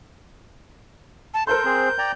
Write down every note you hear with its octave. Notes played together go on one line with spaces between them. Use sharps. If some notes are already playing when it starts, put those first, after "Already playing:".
A5
A4 A#4 C5 C6 G6
C4 G#4
D5 G5 A#5